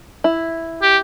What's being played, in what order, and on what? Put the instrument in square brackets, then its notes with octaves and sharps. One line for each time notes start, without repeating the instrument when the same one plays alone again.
[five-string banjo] E4
[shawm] G4